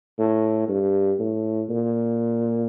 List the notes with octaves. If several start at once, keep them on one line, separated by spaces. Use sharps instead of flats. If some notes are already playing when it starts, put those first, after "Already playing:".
A2
G2
A2
A#2